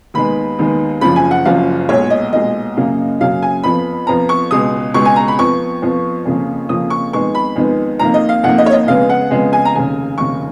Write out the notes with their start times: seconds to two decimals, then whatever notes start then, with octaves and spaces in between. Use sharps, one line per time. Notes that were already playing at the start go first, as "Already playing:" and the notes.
0.14 D#2 D#3 G#3 B3 B5
0.59 D#2 D#3 G#3 B3
1.01 F#1 F#2 F3 B5
1.16 G#5
1.31 F#5
1.45 F#1 F#2 F3 F5
1.89 B1 A#2 G#3 C#5
2.10 D#5
2.33 B1 A#2 G#3 D#5
2.77 F#2 C#3 F#3 A#3
3.20 F#2 C#3 F#3 A#3 F5
3.42 G#5
3.63 F2 F3 B3 B5
4.07 F2 F3 B3 A#5
4.29 C#6
4.51 C#2 B2 G#3 D#6
4.94 C#2 B2 G#3 C#6
5.05 G#5
5.16 A#5
5.28 B5
5.39 F2 F3 B3 C#6
5.82 F2 F3 B3
6.25 F2 C#3 F3 A#3
6.69 F2 C#3 F3 A#3 D#6
6.90 C#6
7.12 F2 D#3 G#3 B3 C#6
7.35 B5
7.56 F2 D#3 G#3 B3
7.99 F2 D#3 A#3 A#5
8.14 D#5
8.29 F5
8.43 F2 D#3 A#3 F#5
8.58 D#5
8.66 C#5
8.73 D#5
8.87 F2 C#3 G#3 B3 F5
9.09 F#5
9.30 F2 C#3 G#3 B3
9.53 G#5
9.65 A#5
9.74 F1 D#2 C#3 G#5
10.18 F1 D#2 C#3 C#6